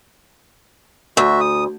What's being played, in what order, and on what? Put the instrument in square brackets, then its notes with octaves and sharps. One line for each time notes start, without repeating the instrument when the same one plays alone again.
[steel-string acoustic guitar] D2 [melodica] F#4 E5
[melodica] D#6